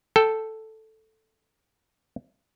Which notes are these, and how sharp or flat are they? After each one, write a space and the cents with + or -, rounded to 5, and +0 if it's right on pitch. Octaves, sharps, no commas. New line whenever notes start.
A4 +0 G5 +0